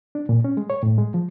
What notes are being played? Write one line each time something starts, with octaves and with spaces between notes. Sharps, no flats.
D4
A#2
C#4
G#3
C#5
A2
G#3
F3